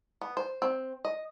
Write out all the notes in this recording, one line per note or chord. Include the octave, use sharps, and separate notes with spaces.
B3
C5
C4
D#5